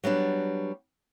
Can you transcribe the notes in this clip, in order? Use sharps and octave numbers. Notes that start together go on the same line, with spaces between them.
F#3 G3 B3 D4